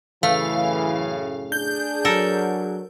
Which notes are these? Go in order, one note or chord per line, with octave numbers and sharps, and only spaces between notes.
F#2 A2 C#3 E3 A3 F5
D4 G#4 G6
F#3 A4 A#4